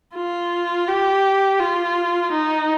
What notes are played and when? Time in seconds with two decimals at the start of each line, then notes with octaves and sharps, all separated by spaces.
0.16 F4
0.88 G4
1.60 F4
2.32 D#4